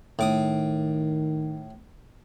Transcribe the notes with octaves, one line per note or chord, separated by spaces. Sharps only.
A2 D#3 D6 D#6